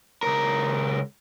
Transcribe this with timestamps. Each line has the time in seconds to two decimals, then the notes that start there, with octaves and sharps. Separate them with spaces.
0.23 C#2 A#4